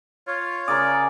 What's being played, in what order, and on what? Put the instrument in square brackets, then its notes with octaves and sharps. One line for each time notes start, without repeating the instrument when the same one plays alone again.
[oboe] F4 [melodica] C#5
[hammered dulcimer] C#3 A#4 [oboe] D5 [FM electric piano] D6 D#6